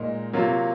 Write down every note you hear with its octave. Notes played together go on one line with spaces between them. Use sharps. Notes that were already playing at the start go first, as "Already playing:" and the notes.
Already playing: A#2 G#3 D#4 A#4
C3 F#3 A#3 F4